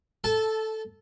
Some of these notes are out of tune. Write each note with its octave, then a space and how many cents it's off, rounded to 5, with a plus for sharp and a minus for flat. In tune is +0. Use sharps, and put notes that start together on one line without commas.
A4 +0 A5 -20